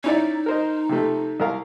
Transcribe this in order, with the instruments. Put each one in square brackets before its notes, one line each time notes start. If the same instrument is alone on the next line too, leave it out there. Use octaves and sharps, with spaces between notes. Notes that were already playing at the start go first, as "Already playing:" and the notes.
[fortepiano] C#4 E4 D5 [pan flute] D#4
[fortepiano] A#4 C5 D#5
C3 F3 A3
C2 A#4 F5